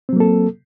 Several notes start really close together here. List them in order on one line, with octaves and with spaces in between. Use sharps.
C4 F#3 A#3 A4